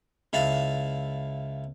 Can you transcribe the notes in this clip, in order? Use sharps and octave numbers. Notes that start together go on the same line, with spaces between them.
C#2 E4 F5 A5